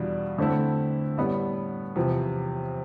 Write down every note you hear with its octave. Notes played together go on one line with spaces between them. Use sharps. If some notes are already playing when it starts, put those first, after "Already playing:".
Already playing: E2 B2 G3 D4 F4
D3 A3 C4 E4
A2 G3 B3
E2 C3 F3